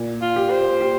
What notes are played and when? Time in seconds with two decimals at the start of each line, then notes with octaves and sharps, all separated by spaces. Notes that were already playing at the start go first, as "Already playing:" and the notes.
Already playing: A#2
0.21 F4
0.36 G4
0.50 C5
0.81 G4